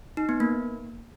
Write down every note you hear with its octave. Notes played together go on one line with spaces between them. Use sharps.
D#4
B3
A#3